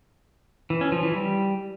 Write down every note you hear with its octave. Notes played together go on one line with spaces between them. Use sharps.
E3
C#4
F3
E3
G3